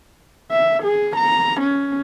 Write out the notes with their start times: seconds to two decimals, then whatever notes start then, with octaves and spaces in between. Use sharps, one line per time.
0.51 E5
0.83 G#4
1.16 A#5
1.61 C#4